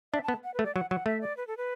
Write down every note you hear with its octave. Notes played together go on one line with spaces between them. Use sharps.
D4 E5
A5
B3
F#5
B4
A3
D5
F#3 F#5
F#3 F#5
A3 E5
D5
B4
A4
B4